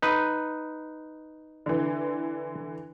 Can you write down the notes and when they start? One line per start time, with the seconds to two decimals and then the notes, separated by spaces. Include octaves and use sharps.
0.02 D#4 B4
1.66 D3 E3